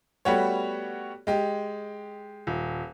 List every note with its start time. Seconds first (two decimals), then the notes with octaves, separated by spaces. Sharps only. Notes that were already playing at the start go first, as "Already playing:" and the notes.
0.25 G3 A3 B3 F#4 G4 C#5
1.27 G#3 G4
2.47 D#1